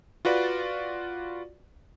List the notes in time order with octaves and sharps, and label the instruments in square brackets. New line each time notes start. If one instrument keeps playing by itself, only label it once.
[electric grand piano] F4 F#4 B4 D5